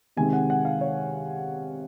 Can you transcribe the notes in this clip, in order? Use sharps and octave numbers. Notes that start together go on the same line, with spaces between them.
C3 D#3 G#3 C4 G#5
F#5
F#5
F5
C#5